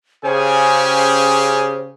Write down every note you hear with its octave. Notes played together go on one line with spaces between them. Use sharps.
C#3 C#4 F4 G4 G#4 C5 G5 G#5